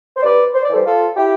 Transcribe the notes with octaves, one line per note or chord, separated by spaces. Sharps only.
C5
G2 B4 D5
C5
D5
E3 G3 A4 C5
F4 A4
E4 G4